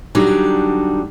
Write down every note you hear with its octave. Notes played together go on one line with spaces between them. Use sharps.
D3 F#3 G3 D4 D#4